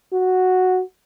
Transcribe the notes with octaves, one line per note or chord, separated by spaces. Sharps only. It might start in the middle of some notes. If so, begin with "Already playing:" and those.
F#4